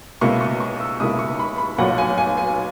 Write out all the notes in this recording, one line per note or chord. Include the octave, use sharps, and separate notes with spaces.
C#2 B2 A#3 E4 C#6
C#6
C#6
E6
C#2 B2 A#3 E4 D#6
C#6
B5
B5
B1 A#2 F#3 F#5
G#5
G#5
G#5